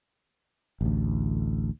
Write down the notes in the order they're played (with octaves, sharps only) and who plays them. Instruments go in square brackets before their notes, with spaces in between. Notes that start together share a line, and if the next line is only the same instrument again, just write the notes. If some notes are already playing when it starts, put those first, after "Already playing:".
[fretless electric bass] A1 D2